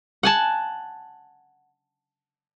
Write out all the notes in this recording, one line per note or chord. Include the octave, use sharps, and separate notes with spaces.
F#5 G#5 A5